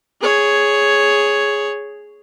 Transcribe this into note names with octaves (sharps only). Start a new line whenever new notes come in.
G#4 C#5